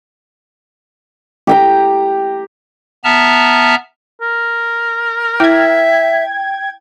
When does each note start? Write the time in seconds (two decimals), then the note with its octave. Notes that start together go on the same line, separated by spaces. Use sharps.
1.47 G4 G5 A#5
3.04 B3 E5 A5 A#5 F6
4.22 A#4
5.40 E4 E5 G5 G#6